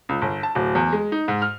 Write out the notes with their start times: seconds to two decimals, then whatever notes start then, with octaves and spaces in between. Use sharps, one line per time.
0.09 C#2
0.22 G1
0.43 A5
0.55 D1
0.75 E2
0.92 G#3
1.12 D#4
1.28 G#2
1.42 F6